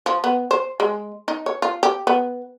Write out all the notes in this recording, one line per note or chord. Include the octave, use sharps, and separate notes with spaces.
F3
B3
C5
G#3
D#4
C#5
F4
G4
B3